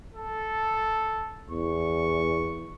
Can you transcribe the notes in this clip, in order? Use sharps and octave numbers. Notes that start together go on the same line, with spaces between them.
A4
E2 C#6